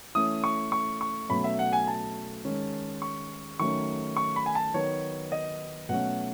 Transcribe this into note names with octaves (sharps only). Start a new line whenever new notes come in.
E3 A3 C#4 D#6
C#6
C#6
C#6
B2 F#3 A3 C#4 B5
E5
F#5
G#5
A5
D#3 G#3 C#4
C#6
D#3 F#3 A3 C#4 C#6
C#6
B5
G#5
A5
D#3 F#3 B3 C#5
D#5
B2 F#3 A3 C#4 F#5